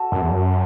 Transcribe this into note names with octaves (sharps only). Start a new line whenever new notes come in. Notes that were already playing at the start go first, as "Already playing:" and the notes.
Already playing: F#4 A4
F#2
E2
F#2